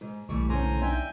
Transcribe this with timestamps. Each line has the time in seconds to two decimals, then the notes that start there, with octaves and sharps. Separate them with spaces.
0.01 G#2
0.29 B1 E3 G3 A3 C#6
0.49 A2 D3 C#4 C5 G#5 A#5
0.82 D4 D#4 E5 G5 G#5